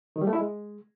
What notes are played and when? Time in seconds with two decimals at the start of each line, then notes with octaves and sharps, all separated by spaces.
0.16 D#3
0.21 G3
0.27 A3
0.33 E4
0.39 G#3